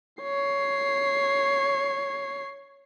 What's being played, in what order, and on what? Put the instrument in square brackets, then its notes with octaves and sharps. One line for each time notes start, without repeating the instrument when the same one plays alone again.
[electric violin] C#5 C7